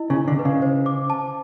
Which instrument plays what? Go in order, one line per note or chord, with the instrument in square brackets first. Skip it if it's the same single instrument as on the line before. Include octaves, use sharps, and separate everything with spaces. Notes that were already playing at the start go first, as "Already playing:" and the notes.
Already playing: [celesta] E4 D#5
[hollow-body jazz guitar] C#3
[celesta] E4
[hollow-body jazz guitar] D3
[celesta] B4
[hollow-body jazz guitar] C#3
[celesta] C5
D6
A5